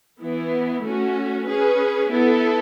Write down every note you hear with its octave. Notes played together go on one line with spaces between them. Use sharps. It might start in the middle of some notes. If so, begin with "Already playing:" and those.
E3 B3 E4
A3 C#4 F#4
C#4 G#4 B4
B3 E4 A4